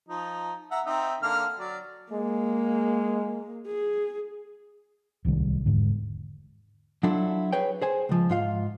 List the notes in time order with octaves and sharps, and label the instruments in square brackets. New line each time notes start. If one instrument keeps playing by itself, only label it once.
[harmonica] F3 D#4
E5 F#5 A#5
C4 D#4 E5
D3 A#3 F6
F#3 D5
[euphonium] G#3 [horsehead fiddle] A#3
[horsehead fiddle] G#4
[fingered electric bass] D1 C2 D#3 G3
E1 G#2 D3
[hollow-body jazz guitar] F#3 D4 E4 F4 A4
G#4 B4 C#5 G5
G#4 C5 G#5
C#2 F3
G#2 F4 F5